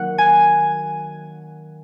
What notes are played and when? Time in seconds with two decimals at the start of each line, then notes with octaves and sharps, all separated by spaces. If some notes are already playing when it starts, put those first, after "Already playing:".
Already playing: D#3 F#3 A#3 F#5
0.18 G#5